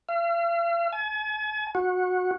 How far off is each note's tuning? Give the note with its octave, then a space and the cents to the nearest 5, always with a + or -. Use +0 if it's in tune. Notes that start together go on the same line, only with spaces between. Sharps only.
F5 -45
G#5 +40
F#4 -20